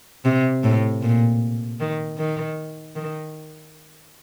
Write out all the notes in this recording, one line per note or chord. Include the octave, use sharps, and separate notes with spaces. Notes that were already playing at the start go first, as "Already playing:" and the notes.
C3
A2
A#2
D#3
D#3
D#3